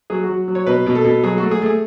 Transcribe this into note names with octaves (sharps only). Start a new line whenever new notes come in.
F#3 G#4
F#4
F#3
F#3
C#5
B2 B4
B2
A4
B2
F#3 G#4
A3 F#4
G#4
A3 G#4